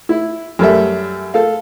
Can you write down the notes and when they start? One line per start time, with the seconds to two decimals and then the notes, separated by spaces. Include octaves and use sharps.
0.09 E4
0.59 F#2 G3 A4 E5
1.34 A4 F5